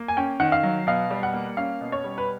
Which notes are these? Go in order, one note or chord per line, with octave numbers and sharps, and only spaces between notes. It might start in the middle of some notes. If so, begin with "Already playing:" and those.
Already playing: A#3
G#5
C#4 G5
D#3 F#5
F5
F#3
B2 F5
G3
F#5
A#3
C#4 F5
B2
C#5
G3
B4